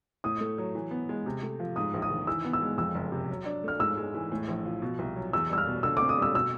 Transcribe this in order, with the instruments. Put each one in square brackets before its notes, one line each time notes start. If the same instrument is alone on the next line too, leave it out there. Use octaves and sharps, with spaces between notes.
[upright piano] A2 [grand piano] D#6
[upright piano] A3
F#3
E3
B3
G#3
C3
A3
F3
[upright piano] G#2 [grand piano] D#6
[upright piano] A#1
[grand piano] D#6
[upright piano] D#3
[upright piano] E3 [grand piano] E6
[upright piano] B3
[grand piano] E6
[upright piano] G#3
[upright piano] F2 [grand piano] E6
[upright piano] F#1
C3
F#3
D4
[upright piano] A3 [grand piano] F6
[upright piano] G#2 [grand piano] E6
[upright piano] G#3
E3
A2
A#1
F3
B2
C2
F#3
[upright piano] E2 [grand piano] E6
[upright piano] G3 [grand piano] E6
[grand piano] F6
[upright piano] B2
[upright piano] D3 [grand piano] E6
[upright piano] C4 [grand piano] D6
[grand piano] D#6
[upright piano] G3 [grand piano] E6
[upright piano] B2 [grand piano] E6